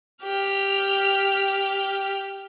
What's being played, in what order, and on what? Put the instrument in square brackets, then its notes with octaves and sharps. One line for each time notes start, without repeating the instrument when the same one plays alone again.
[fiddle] G4 F6